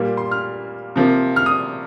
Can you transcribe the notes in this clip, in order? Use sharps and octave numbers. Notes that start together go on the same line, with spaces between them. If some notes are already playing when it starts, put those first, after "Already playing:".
Already playing: A#2 G3 A#3
C6
F6
C3 F3 A#3
F6
D#6